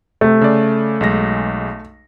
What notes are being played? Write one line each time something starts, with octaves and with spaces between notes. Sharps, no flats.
C3 A3
C#3 D5
B1 G#3 A#6